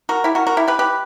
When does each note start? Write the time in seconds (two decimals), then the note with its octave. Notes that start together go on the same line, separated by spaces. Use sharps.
0.09 F#4 A#4
0.24 E4 G4
0.35 F#4 A#4
0.47 F#4 A#4
0.57 E4 G4
0.68 G4 B4
0.79 G4 B4